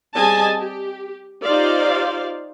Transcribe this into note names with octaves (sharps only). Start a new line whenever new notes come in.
G3 C4 G#4 D#5 G#5 A5
G4
D#4 F4 G4 C5 D5 F5